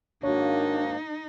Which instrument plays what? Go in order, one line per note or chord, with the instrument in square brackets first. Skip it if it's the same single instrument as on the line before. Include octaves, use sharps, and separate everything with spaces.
[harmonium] G#2 D#3 A#3 [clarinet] D4 [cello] D#4 [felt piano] F#4 C#5